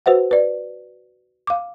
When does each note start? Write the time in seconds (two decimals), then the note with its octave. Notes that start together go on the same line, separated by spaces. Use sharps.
0.06 F#4 B4 C5 E5 F#5
0.31 B4 D5
1.47 F5 D6